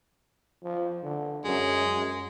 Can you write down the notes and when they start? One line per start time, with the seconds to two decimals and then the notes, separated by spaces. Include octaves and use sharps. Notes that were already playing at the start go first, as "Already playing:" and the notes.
0.63 F3
1.03 D3
1.45 F#2 G#3
1.93 F#2